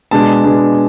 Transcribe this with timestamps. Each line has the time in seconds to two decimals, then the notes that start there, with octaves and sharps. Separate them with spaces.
0.11 B2 G#3 D4 A5
0.44 B2 G#3 D4